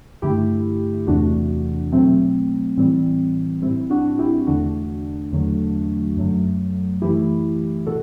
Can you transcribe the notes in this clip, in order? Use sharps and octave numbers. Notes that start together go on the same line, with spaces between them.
G2 D3 A3 E4 G4
E2 C3 E3 A3 D4 F#4
B2 F#3 A3 C4
A2 E3 G3 C4
A2 G3 C4 E4
D4 F#4
E4 G4
E2 D3 A3 D4 F#4
E2 D3 F#3 A3
F#2 F#3 A3
F#2 E3 A3 E4 G4
B2 F#4 A4